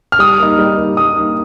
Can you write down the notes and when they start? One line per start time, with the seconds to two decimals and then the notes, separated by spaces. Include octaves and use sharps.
0.12 F6
0.19 G3 D#6
0.39 A#3 D#4
0.59 G3
0.78 A#3 D#4
0.97 G3 D#6
1.16 A#3 D#4